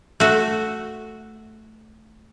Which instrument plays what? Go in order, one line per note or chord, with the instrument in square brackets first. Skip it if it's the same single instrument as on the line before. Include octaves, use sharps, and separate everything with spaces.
[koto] A3 F#4 E5